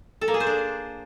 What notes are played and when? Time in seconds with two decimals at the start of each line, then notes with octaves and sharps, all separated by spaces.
0.21 A4
0.28 A#3
0.34 G#4
0.40 C5
0.47 D4